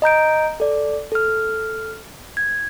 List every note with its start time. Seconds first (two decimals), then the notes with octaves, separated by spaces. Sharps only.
0.02 D#5 A#5 G6 D7
0.60 A4 D5
1.12 A4 F6
2.37 G#6